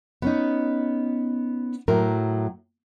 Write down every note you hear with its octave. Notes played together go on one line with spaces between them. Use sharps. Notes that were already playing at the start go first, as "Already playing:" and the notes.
B3 C#4 D#4
A2 F#3 A#4